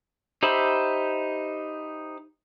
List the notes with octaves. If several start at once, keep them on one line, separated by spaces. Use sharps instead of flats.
D#4 G4 C5 E5 B5